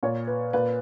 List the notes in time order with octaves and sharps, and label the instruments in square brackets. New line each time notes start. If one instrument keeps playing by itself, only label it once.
[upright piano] A#2 C#5
B4
A#2 B4